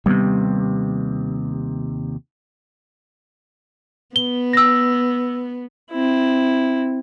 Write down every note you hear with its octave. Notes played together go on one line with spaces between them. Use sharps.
D#2 C3 G3 B3
B3 G7
E6 A#6
C4 E4